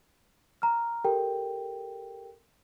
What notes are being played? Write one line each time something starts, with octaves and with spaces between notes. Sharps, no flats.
A#5 F6
G4 A4 A#4 G5